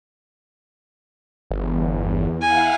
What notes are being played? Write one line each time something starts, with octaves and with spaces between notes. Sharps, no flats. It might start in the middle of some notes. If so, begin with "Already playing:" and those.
G1 E2
E4 F5 F#5 G#5